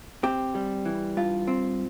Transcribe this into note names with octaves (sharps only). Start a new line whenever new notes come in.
C4 G4
G3
E3
G2 F4
C4